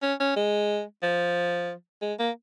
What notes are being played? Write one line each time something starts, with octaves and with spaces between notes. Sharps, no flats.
C#4
C#4
G#3
F3
G#3
A#3